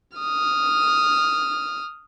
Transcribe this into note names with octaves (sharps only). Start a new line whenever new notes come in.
D#6 F6